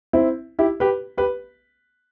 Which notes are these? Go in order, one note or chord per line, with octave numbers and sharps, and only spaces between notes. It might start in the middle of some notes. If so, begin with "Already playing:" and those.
C4 E4
E4 G4
G4 B4
G4 B4